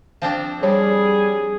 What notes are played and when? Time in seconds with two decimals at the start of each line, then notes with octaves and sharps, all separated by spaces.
0.22 F3 C4 D4
0.63 G3 G#4 C#5